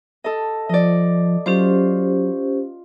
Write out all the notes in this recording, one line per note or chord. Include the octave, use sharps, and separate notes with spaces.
A4 D#5
F3 D5 D#5
F#3 C#4 F4 G4 C5